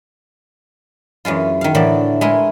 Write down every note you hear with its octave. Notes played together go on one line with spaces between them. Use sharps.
F#2 E3 G#3 F4
D#3 F5
A2 D3 E3 A3 D5
G#3 A3 E4 G#4 A#4